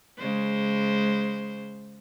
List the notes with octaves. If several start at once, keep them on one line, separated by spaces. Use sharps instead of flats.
C#3 G#3 C5